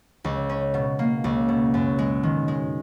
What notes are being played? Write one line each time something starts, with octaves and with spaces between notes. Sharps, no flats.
C#2
C#4
B2
A#3
C#2
B2
F#2
G#3
D#3
G#3